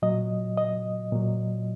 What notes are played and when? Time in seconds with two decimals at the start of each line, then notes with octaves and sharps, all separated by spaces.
0.02 A#2 F#3 D#5
0.57 D#5
1.12 A#2 F#3